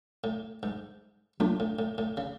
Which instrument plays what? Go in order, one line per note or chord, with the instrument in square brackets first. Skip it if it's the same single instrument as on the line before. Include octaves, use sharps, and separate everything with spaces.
[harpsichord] A2
G#2
[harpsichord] A2 [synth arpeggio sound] F#3 A#3 D4 F4
[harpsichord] A2
A2
A2
C#3